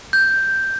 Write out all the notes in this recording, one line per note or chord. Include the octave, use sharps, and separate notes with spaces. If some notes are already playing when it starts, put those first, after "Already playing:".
G6